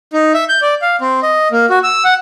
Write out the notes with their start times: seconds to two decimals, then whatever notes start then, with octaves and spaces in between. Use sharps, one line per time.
0.13 D#4
0.34 E5
0.49 G6
0.62 D5
0.82 F5
1.01 C4
1.23 D#5
1.52 A#3
1.70 F#4
1.83 E6
2.04 F#5